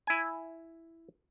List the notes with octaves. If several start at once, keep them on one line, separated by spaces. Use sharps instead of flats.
E4 G#5